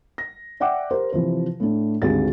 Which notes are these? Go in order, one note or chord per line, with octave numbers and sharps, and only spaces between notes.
A#6
D5 E5 F#5 G5 D6
G4 A#4 C5
C3 E3 F3 C5
A2 A3 D4
G#1 D2 C4 G4 G#4 A6